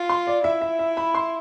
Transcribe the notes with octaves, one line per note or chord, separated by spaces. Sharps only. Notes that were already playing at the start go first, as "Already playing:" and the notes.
Already playing: F4
C6
D5
E4 E5
E5
E5
B5
C6